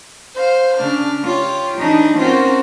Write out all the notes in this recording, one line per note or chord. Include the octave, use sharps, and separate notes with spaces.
C5 F5
C#3 D4 F6
F4 G4 C#5
E3 D4 D#4
C4 C#4 F4 F#4 A#4